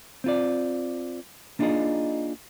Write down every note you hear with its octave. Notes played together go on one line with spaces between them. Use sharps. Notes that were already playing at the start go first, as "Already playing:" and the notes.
C4 F4 D5
A#3 D4 D#4 F4 G#4 D#5